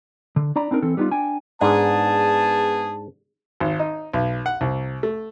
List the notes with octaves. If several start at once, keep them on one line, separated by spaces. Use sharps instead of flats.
D3
D4 D5 A#5 B5
C4 D4 D#4 A#4
E3 C4 A4
G3 B3 C#4 D#4 F4
D4 G5 G#5
G#2 B3 D4 G#4 A5
G#1
D#4
B1
F#5
C2
A3